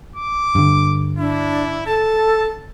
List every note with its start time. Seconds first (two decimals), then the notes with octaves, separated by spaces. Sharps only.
0.16 D6
0.55 G2 D3
1.18 D4 E4
1.87 A4 A5